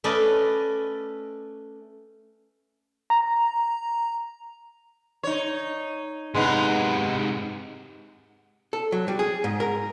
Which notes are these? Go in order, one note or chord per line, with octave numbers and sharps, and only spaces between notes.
A3 C#4 B4 D5 D#5
A#5
D#4 C#5
G#2 C3 G#3 B3 D#4
A4
F#3
G3
G#4
G#2
A#4